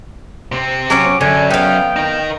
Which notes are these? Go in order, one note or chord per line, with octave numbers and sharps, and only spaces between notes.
C3 C4
F#3 C#4 C#5 D6
F#2 D3 G#5
B3 F5 G5
D#4 A#4